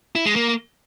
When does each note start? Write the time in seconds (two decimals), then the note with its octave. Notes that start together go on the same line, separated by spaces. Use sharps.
0.16 E4
0.26 G#3
0.36 A#3